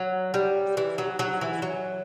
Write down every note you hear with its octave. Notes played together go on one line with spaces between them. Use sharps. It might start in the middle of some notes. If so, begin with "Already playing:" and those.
Already playing: F#3
G3
E3
F#3
F#3
E3
F#3